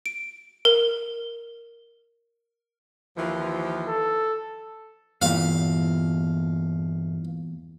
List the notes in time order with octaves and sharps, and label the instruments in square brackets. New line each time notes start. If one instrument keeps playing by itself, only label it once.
[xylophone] D7
A#4
[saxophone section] D#2 E3 F3
[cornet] A4
[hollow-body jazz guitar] E2 A#2 [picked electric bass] G2 E3 [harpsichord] F5